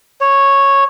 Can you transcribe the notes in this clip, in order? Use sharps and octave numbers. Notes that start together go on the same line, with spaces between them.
C#5